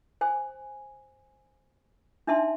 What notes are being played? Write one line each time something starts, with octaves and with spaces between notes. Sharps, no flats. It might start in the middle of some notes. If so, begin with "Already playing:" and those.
C5 G#5
D4 D#4 E5 A5 C6